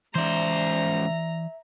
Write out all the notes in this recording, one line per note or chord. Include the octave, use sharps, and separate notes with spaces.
C#2 E3 C5 D5 E5 A#5